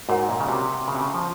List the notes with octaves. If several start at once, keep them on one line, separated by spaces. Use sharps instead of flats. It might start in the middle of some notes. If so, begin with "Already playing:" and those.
G#2 F#4 A#4 C#5 F#5
A#2
C#3
C3
C#3
C3
C#3
F3